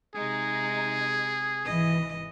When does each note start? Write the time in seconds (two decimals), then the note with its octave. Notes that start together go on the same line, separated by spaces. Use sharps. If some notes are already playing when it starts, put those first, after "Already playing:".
0.15 C3 G#3 D#4 G#4
1.65 G#1 E3 D#5